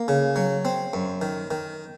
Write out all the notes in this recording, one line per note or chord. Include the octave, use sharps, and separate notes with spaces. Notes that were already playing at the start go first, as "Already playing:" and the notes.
Already playing: A#3
C#3
F#3
C4
F#2
D#3
D#3